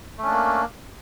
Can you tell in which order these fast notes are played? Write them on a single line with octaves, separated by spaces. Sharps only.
A3 C#4 D4 A#3